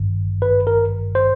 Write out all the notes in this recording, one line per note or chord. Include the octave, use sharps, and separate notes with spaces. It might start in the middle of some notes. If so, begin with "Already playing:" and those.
Already playing: G#1 G2 D#3
B4
A#4
C5